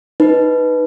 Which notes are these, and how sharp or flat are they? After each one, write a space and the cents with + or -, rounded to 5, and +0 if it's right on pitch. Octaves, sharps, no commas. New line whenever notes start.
D#4 +0 B4 +0